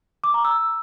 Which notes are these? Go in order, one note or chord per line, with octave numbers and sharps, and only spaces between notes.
D6
A#5
E6